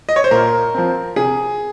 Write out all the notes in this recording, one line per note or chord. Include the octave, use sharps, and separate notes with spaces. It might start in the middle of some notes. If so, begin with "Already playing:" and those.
D#5
C#5
C5
A#2 A#4
F3 C4
C3 G#4